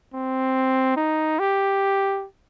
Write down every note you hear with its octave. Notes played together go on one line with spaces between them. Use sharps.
C4
D#4
G4